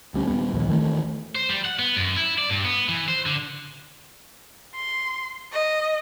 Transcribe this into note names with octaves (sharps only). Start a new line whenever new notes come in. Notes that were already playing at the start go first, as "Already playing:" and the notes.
D2 G3 C#4
D#1 G3 B3
A#1 D#2
D#3 E3 A3
C5
G3
F#5
B3
F#2
E4
D5
G2
B3
E3
C5
D3
C6
D#5